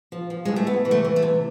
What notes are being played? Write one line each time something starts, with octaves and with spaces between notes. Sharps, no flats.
F3
F3
A2 G#3
A3
C3 B3
E3
A3
E3
A3
C3